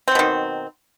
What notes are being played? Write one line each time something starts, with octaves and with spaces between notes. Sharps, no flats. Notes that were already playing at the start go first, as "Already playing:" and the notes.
B2 D#3 F#3 C4